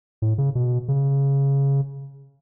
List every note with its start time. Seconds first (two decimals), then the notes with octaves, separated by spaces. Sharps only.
0.22 A2
0.38 C#3
0.55 B2
0.88 C#3